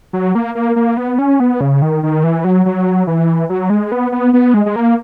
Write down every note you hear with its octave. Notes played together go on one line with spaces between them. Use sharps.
F#3
A#3
A#3
A#3
B3
C#4
B3
C#3
D#3
D#3
E3
F#3
F#3
E3
F#3
G#3
B3
B3
B3
G#3
G#3
A#3